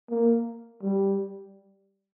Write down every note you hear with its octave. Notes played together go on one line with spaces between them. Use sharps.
A#3
G3